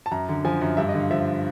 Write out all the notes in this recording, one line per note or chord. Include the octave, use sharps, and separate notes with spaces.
A5
F#2 A#5
D3
F3 G#5
F#2
G2 E5
D#5
D3
F5
F3 E5